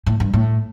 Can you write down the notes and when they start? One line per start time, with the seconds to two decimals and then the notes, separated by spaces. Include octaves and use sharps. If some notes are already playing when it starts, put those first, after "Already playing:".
0.06 A2
0.20 G2
0.33 A2